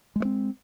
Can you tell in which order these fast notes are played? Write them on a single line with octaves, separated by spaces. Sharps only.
G#3 A3 C4